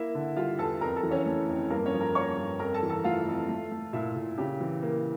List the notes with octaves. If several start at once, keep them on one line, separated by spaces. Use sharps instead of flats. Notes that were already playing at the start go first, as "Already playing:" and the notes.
Already playing: A#3 E4 E5
D3
G3 F4 F5
E2 A4 A5
F2 A#4 A#5
A4 A5
E3
C#4 C#5
A3
F2
G2 A#3 A#4
C#4 C#5
F3
A#4 A#5
A#3 C#5 C#6
G2
F2 A#4 A#5
A4 A5
E3
A4 A5
A3 F4 F5
F2
A3
A3
A#2 E4 E5
A#2
C#3 G4
E3
A#3